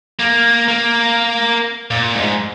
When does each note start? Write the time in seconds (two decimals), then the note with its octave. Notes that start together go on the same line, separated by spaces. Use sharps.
0.19 A#3
0.68 A#3
1.91 A#2
2.15 G#2